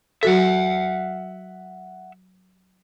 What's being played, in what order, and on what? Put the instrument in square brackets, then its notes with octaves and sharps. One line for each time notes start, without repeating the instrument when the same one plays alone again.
[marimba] F#3 F#4 A4 [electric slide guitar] E5 F#5